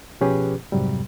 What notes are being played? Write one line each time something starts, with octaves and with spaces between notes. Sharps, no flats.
B2 F3 C#4 G4 G#4 B4
F2 G#2 C3 F#3 G3